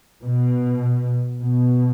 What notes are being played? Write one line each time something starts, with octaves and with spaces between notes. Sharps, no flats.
B2
B2